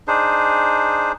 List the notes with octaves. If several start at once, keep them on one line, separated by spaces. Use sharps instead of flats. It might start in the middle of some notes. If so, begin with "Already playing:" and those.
D4 D#4 G#4 C5